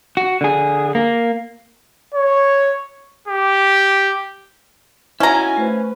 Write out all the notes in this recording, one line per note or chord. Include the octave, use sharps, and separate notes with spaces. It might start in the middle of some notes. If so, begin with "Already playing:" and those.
F#4
D3 G#4
A#3
C#5
G4
C#4 D#4 E4 F#4 G#5 A#5
A3 B4 C5